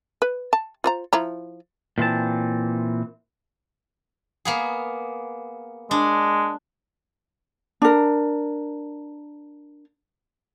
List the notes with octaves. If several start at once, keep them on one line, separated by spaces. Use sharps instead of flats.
B4
A5
F4 C5 A#5
F3 E4 A#5
A#2 E3 C4 A5
A#3 B3 G#4
G#3 D4
D4 A#4